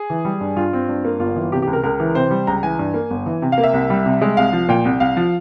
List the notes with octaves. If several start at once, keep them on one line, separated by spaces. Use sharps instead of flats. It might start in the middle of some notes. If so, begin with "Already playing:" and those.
Already playing: G#4
E3
G3
G2
G2 F4
C4
G2
A#3
G1 F4
E3
C3 G4
G4
C#2
A#4
C#2 A#4
E3
C3 C5
G3
C#2 A#5
E3 G#5
G2
A#3
G1
E3
C3
F5
A#3
E5
C2
G3
C3
G#3
C2 F5
F3
A#2 G5
C2
C2 F5
F3